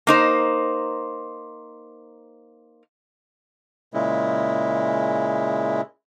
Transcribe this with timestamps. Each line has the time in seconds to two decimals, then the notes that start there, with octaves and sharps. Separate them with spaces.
0.07 A#3 D#4 C5
3.94 A#2 C#3 G#3 E4